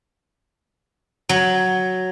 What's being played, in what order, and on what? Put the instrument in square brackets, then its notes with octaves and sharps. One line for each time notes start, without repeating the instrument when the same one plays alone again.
[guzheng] F#3